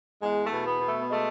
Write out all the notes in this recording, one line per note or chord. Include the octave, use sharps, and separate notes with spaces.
E2 G#3
A3
B2
B3
B2
A3
B3
G#3 A3